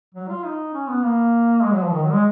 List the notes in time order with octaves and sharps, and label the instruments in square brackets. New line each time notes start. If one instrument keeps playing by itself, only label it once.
[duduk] F#3
F4
D#4
C#4
B3
A#3
G#3
F#3
F3
D#3
F#3
G#3